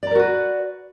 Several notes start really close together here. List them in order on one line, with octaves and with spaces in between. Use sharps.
D5 A#5 A#4 F#4 B4